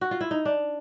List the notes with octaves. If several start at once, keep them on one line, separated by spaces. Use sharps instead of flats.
F#4
F4
E4
D#4
D4